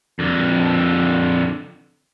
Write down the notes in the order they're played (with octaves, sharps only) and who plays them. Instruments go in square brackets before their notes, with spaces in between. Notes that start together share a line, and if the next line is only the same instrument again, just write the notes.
[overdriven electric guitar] F2 D3